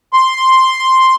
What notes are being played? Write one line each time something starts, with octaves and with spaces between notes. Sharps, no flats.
C6